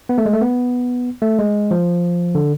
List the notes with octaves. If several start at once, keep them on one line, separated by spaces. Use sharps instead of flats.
B3
A3
G#3
A3
B3
A3
G#3
F3
D3